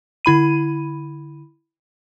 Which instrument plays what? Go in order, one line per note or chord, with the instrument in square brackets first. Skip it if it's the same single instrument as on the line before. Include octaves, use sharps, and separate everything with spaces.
[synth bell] D3 E4 B5 D#7